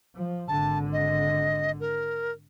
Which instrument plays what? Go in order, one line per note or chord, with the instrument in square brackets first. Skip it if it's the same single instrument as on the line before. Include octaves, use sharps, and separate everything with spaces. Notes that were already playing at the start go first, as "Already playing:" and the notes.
[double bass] F3
[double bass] G#1 D3 [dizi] A5
[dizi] D#5
A#4